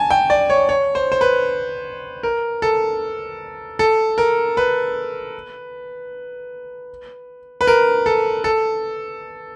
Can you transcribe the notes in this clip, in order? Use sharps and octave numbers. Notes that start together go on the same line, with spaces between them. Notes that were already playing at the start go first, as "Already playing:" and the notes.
Already playing: G#5 A5
G5
D5
C#5
C#5
C5
C5
B4
A#4
A4
A4
A#4
B4
B4
A#4
A4
A4